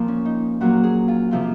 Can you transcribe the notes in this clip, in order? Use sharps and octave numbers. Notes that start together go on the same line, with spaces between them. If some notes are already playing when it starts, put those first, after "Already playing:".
Already playing: A#2 F3 A#3
C#4
D#4
A#2 F#3 A#3 F#4
G#4
F4
C3 F3 A#3 F4